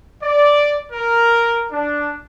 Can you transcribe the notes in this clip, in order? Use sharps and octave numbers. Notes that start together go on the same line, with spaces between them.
D5
A#4
D4